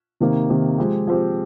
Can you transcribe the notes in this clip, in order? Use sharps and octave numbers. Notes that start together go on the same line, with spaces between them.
C3 D#3 A#3
C3 D#3 A#3
F3 G#3 C4 G4
F3 G#3 C4 G4